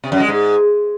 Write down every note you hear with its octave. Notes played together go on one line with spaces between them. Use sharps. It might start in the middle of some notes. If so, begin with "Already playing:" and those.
C3
F#2
G#3
G#2